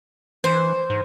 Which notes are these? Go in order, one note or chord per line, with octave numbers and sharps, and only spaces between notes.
E3 C5
G#2